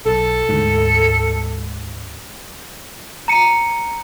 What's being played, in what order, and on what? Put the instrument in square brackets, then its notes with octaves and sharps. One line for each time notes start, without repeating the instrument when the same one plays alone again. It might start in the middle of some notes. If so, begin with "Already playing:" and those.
[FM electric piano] B1 A5 [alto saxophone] A4
[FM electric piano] D2 G#2
[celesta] A#5 C#7 D#7